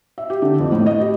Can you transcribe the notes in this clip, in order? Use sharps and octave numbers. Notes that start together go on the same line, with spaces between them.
E5
G4
D3
F2
A2
D#5
G4